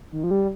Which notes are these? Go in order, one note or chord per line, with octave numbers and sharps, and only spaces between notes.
D#3
F3
G3